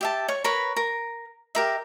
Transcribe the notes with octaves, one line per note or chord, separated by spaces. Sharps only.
G4 E5 A5
C#5 C#6
A#4 B4 C#5 B5
A#4
G4 A#4 E5